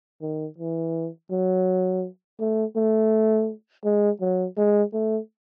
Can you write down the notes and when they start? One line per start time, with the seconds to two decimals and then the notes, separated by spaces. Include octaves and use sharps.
0.22 D#3
0.58 E3
1.31 F#3
2.39 A3
2.76 A3
3.85 G#3
4.21 F#3
4.58 G#3
4.94 A3